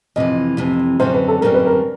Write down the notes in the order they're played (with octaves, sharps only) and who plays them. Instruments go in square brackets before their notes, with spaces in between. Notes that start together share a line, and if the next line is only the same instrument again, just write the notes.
[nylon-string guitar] F2 C3 E3 [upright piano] D#5
[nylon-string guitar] F2 C3 E3
[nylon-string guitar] F#2 D3 G3 C4 [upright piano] C5
[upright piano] B4
A4
[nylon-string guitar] F#2 D3 G3 C4 [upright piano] A#4
[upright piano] B4
A#4